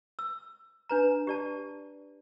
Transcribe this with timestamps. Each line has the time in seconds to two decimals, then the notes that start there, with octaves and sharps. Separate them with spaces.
0.19 E6
0.89 D4 B4 A#5
1.27 G4 D5 A5